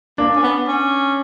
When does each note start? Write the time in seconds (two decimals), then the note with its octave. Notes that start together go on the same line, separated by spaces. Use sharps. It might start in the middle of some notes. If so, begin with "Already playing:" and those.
0.18 A#3 D4
0.35 C#4
0.43 B3
0.68 C#4